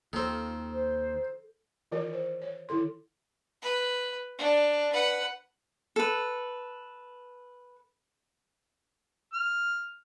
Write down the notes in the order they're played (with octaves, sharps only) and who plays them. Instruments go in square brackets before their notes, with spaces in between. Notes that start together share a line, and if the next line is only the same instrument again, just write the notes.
[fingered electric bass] D#2 [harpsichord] D#3 C4 [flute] F4 [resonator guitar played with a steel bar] A4
[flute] C5
[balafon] D#3 E3 F4 A#4 C#5
C5
C#5
D#3 E4 A4 C6
[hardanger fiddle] B4
D4
B4 F#5
[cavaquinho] A4 B4
[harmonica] F6